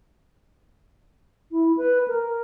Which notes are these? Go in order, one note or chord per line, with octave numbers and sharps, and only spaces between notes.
E4
B4
A#4